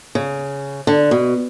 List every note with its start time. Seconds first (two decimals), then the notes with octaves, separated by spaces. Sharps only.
0.15 C#3
0.87 D3
1.11 B2